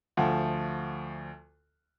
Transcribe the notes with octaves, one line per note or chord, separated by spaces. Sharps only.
D2 F3 A3 F#5